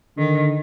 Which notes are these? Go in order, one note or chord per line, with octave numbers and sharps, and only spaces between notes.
D3 D#3